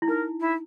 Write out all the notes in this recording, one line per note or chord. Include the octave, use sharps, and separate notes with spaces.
E4
D#4 A#4
E4